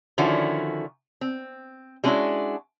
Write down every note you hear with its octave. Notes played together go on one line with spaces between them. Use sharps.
D3 D#3 F3 C#4 E4 F#4
C4
G3 G#3 C#4 D4 E4 F#4